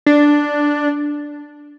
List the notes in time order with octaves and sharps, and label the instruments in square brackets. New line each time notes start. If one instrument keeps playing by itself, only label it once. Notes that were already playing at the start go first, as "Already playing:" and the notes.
[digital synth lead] D4